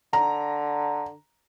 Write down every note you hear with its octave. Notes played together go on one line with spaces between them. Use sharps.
D3 A#5